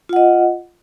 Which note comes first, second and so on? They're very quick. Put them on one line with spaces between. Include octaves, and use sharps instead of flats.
F4 F#5 D#5